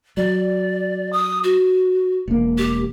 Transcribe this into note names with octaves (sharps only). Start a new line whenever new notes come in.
F#3 D5
D#6
F#4
E1 A#3
G4